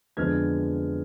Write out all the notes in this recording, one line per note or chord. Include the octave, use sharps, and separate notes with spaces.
F2 D3 G#3 B3 D4 F6 G#6